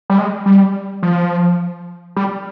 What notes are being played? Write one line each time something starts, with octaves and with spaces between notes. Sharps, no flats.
G3
G#3
G3
F3
G3